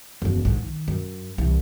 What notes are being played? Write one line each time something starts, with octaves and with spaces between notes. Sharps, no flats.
F#1 E2
A#1 G#2
D#3
F#2
C2 E3